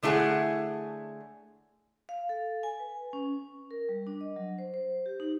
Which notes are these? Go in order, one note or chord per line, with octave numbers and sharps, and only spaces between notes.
D3 A3 E4 G#4 C#5 F#5
F5
A4
G#5
B4
C#4
A#4
G3
D4
D#5
F#3
C5
C5
G4
D#4